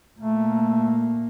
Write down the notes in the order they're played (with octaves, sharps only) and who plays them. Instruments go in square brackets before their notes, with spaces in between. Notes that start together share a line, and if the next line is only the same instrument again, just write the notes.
[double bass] A#2 A#3 [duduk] A3